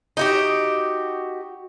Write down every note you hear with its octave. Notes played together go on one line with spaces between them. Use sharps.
D#4 F#4 G4